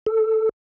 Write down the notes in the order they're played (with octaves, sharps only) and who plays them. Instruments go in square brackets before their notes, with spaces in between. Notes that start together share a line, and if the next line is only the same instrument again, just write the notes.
[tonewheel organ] A4